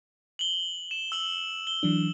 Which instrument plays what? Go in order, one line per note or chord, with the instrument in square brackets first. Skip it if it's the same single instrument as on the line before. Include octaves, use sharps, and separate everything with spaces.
[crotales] F#7 G7
E7
E6 F#7
G7
[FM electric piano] E3 F#3 D4